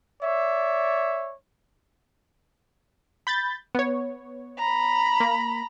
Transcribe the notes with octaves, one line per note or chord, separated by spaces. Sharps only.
C#5 D5 E5
B5 G6 A6
B3 C#5
A#5 B5
A#3